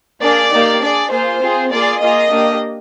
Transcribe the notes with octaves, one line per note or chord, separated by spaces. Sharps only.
A#3 D4 G#4 D5
A#3 D#4 G4
D4 G#4 D5
A#3 F4 G#4 C5
C4 F4 G#4
A#3 F4 G#4 D5
A#3 F4 G#4 D#5
A#3 D4 G4